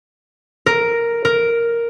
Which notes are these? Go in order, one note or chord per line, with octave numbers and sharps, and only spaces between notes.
A#4
A#4